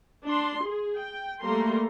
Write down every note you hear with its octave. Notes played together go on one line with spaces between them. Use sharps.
D4 C6
G#4
G5
G3 A3 A#3 A#5 C6